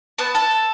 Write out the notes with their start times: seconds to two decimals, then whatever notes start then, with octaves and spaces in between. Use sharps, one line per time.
0.19 B3 A5
0.35 A4 A5